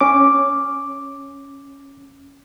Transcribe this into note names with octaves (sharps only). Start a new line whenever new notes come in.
C#4 D6